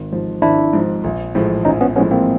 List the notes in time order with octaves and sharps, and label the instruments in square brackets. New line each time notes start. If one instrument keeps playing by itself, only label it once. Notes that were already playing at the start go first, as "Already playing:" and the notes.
Already playing: [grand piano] G#1
G#2 F3
[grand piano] G#1 [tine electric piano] D4 E4
[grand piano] G#2 F3
A#1
A2 F3 G#3
[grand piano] A#1 [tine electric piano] C#4 D#4
[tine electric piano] B3 C#4
[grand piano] A2 F3 G#3 [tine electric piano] B3 C#4
[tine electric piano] A#3 C4